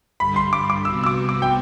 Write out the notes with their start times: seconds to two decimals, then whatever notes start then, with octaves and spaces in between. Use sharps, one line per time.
0.20 G2 D3 G3 B5
0.36 C6
0.53 D6
0.70 D6
0.85 C3 G3 B3 F#4 E6
1.04 E6
1.06 D6
1.29 D6
1.42 G5